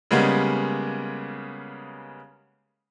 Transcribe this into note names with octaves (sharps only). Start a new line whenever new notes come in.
C#3 G3 G#3 A#3 B3 C#4